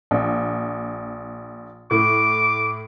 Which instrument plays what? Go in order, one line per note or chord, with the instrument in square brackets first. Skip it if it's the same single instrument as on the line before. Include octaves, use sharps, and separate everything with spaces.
[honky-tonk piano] A#1
[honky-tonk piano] A2 [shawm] D6